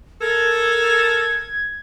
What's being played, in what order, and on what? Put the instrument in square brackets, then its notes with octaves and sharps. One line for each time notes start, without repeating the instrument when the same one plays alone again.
[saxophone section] A4 A#4 [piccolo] G#6